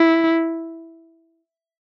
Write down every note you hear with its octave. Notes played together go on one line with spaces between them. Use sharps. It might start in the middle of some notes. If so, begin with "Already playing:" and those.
Already playing: E4